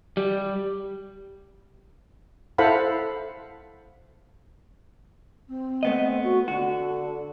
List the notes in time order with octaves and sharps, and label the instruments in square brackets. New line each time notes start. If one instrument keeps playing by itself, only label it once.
[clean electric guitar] G3
[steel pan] E4 A4 C5 F5 F#5 B5
[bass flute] C4
[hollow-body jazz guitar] A3 B3 D#5
[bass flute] F#4
[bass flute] D3 [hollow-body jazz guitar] F#4